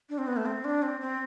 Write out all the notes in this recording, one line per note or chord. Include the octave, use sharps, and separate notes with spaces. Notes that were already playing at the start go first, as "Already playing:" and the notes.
D4
C4
B3
A3
C4
D4
C4
C4